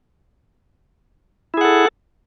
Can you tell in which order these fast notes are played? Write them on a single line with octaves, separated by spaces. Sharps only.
E4 G#4 F#5 A4